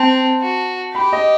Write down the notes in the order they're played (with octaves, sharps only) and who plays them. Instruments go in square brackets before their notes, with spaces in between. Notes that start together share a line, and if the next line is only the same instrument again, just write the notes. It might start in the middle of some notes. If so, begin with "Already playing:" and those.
Already playing: [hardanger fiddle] C4 [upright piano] A5
[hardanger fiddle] F#4
[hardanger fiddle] G4 [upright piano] B5
[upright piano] D#5